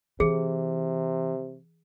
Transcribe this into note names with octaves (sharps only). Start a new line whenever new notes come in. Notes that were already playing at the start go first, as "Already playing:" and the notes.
C3 E3 G#4